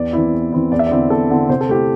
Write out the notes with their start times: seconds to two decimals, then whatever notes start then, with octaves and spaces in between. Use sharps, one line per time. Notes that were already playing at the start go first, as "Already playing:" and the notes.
Already playing: E2 D5
0.13 E3 C4 E4
0.33 E2
0.52 E3 C4 E4
0.72 E2 D5
0.79 E5
0.87 D3 C4 E4 D5
1.10 E2 A4
1.30 D3 C4 E4
1.49 C3 C5
1.61 A4
1.69 A3 E4 G4